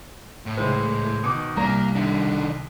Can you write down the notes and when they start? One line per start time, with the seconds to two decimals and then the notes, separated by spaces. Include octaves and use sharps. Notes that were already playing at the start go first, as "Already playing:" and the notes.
0.46 A2
0.57 C#2 E3 G#3 C5
1.24 B2 D#3 D6 D#6
1.57 C2 G3 A#3 D5 A#5 A#6
1.95 D#3 D4 E5